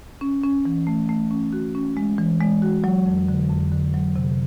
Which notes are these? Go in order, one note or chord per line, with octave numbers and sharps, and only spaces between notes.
C#4
C#4
E3
A3
A3
C#4
F#4
C#4
G#3
E3
G#3
F#4
F#3
F2
D3
F2
D3
F#3
C3